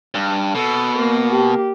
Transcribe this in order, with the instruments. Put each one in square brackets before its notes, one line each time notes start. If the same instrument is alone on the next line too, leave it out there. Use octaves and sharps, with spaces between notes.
[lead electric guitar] G2
[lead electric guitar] B2 [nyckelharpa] A4
[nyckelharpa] A#3
[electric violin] G4